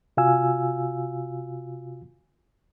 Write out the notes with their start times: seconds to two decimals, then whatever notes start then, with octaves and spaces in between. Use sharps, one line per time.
0.17 C3 F4 F#4 F5 G#5 E6